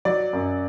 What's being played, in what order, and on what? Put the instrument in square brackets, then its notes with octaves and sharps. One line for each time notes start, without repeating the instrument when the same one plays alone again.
[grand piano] F#3 D5
F#2